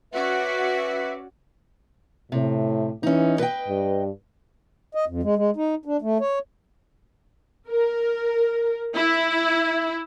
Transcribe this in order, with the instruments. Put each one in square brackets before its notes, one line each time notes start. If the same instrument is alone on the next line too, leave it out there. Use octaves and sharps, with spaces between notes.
[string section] C#4 F#4 D5 [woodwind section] B4 E5
[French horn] A2 [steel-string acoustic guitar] C3
[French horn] E3 [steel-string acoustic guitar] C#4 D#4
[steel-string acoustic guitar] B4 D#5 G5
[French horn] G2
[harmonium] D#5
F2
G#3
G#3
D#4
D4
A3
C#5
[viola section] A#4
E4